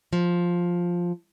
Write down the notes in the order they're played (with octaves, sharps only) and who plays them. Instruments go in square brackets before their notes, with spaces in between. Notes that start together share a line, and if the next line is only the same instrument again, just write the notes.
[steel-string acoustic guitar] F3